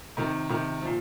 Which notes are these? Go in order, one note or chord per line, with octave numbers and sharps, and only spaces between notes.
C3 D#3
C3 D#3
A#2 F3